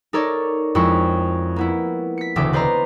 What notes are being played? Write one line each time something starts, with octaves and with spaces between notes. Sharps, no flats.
D#4 A4 A#4 C#5 D5
F2 G#3 E4 C#6
A#3 B3 E4
B6 C#7
E1 D2 C#3 E5 D6
B4 C5 D5 D#5 A#5 C6